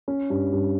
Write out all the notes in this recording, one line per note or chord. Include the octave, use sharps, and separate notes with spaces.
C#4
G2
G2